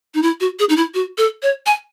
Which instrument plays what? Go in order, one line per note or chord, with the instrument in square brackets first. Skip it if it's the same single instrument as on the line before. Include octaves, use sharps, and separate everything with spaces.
[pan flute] D#4
E4
F#4
G#4
D#4
E4
F#4
A4
C#5
G#5